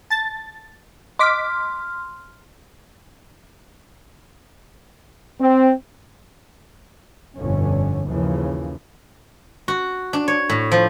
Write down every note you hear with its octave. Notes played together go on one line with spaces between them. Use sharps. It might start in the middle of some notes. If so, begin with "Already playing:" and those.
A5 A6
D#5 C6 D6 F6 B6
C4
G1 F2 B2 D3 C#4
D#2 C#3 E3 F3
F#4
D4
C#5
A2
F3